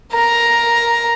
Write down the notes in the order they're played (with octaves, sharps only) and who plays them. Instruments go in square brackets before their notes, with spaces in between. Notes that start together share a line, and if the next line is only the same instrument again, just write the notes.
[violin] A#4 A#5